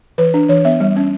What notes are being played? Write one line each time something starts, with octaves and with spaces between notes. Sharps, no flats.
E3 B4
D4
E3 C#5
B3 E5
G3
C#4